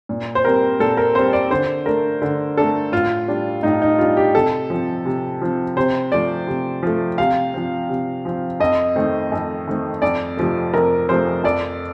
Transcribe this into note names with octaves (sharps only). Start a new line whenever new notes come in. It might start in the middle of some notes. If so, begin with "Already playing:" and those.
A#2
C5
G3 C4 A#4
A#2 A4
A#4
G3 C4 C5
D5
D3 C5
A3 D4 A#4
D3
A3 D4 A4
A2 F4
G3 D4
A2 D#4
D#4
G3 D4 F4
G4
C3 A4
F3 C4
C3
F3 C4
C3 C5
F3 A3 D5
C3
F3 A3
C3 F5
F3 C4
C3
F3 C4
F2 D#5
D#3 A3 C4
F2
D#3 A3 C4
F2 D5
C3 F3 A3
F2 A#4
C3 F3 A3 C5
F2 D5